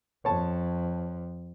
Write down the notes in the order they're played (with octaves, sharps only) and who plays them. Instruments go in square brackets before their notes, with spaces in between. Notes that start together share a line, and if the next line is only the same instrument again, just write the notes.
[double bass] F2 [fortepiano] C#5 A5